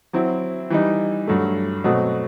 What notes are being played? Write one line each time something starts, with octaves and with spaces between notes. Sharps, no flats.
F#3 C4 E4
E3 G3 D#4
G2 F#3 A3
B2 F#3 A3 C4